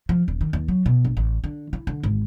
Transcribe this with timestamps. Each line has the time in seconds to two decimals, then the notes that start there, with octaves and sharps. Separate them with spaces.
0.09 F3
0.28 D#1
0.41 D#3
0.53 D#2
0.68 F#3
0.86 B2
1.05 A#1
1.17 A1
1.44 D3
1.73 E4
1.87 D3
2.03 G#1